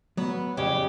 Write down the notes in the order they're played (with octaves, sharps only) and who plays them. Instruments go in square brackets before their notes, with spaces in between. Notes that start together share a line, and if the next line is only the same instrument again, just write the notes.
[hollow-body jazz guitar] F#3 [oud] B3
[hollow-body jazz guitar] C2 F2 C#5 [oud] C#3 [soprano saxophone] G4